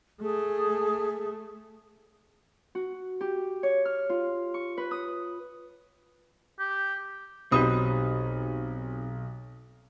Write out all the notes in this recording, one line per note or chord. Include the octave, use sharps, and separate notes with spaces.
A3 G#4
F#4
G4
C#5
F6
F4
C#6
B4
D#6
G4
B1 C4 D#4 F#4 G4 B4 B5 D#6